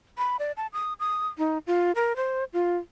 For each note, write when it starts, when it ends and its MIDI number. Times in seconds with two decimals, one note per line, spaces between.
0.18 0.37 83
0.39 0.52 74
0.57 0.67 81
0.73 0.93 87
1.00 1.28 87
1.38 1.58 63
1.67 1.92 65
1.95 2.16 70
2.16 2.44 72
2.53 2.77 65